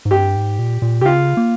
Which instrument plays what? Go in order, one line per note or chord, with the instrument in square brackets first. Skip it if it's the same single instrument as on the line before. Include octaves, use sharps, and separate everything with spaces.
[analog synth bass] G#2
[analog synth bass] G2 [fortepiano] G4
[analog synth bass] G#2
A#2
A#2
[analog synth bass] C3 [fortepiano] G4
[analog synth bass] C#3 [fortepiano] F4
[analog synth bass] A#3